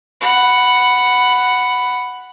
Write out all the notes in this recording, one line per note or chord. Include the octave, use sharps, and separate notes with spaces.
F#5 B5